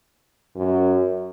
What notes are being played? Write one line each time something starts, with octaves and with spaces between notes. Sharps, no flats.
F#2